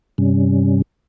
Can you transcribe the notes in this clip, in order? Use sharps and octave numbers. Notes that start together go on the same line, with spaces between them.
G2 C3 G3 C#4